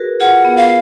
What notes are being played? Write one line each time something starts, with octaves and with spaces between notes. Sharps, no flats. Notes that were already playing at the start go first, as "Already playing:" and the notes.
Already playing: F#4 G#4 A#4 B4
F4 G#4 F#5
B3
F5